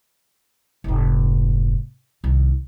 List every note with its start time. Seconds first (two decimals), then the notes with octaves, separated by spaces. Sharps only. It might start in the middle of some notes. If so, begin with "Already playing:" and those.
0.84 F1 G#2
2.24 C2 D#3